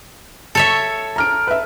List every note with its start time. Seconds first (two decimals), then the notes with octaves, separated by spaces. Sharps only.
0.55 A4 C#5 E5
1.16 A#5 F6 D7
1.47 B4 E5